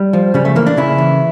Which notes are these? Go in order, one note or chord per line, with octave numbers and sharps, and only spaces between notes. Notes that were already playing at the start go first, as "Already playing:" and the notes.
Already playing: G3
F3
C#3 G3
A3
E3 A#3
D4
C#3 E4
E3